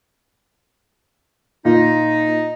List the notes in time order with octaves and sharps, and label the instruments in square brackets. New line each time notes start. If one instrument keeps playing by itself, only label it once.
[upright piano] A#2 [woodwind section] D#4